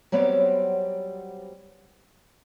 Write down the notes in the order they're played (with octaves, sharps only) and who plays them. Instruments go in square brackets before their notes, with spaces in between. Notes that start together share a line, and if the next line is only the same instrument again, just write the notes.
[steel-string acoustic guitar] F#3 G3 B3 C4 C#5 D5